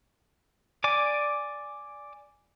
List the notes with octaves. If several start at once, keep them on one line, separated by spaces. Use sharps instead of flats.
D5 G#5 D6